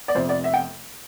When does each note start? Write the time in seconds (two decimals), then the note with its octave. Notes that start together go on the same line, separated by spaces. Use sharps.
0.08 D5
0.15 F1 F2 C3 C5
0.29 D5
0.44 E5
0.54 G5